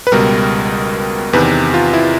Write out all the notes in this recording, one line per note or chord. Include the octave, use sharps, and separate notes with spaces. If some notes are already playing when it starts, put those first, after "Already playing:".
B4
C#2 B2 G3 A#4
E2 C3 D#3 B4
F4
E4